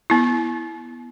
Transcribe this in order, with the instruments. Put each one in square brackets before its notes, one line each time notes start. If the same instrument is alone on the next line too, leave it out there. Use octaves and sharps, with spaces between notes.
[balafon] B3 E4